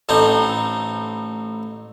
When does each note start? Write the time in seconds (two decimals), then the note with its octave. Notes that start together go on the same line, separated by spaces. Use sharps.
0.09 A1 A2 C4 D#4